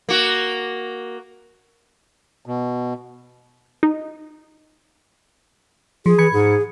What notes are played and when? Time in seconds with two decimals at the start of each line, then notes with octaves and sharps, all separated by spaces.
0.09 A#3 F#4
2.46 B2
3.83 D#4
6.06 F3 G#4
6.18 E3 B5 G#6 C#7
6.33 G#2 G#4